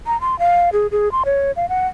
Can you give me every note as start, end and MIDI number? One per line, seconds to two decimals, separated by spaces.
0.07 0.20 82
0.21 0.38 84
0.39 0.70 77
0.73 0.87 68
0.92 1.11 68
1.12 1.23 84
1.25 1.52 73
1.56 1.69 77
1.69 1.87 78